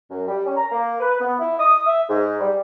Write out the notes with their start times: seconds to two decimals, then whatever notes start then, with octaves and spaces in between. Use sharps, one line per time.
0.10 F#2
0.27 G3
0.45 C#4
0.56 A#5
0.71 A#3
1.00 B4
1.19 B3
1.39 E4
1.60 D#6
1.86 E5
2.09 G#2
2.40 G3